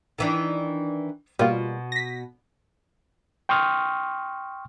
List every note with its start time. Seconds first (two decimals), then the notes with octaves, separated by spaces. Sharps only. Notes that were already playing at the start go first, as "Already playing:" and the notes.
0.18 D#3 E3 D4
1.39 B2 G3 A#3 F4
1.92 A#6 B6
3.49 G5 C6 C#6 D#6 F6